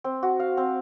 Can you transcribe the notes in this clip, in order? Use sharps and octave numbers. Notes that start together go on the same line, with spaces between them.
C4
F#4
F5
C4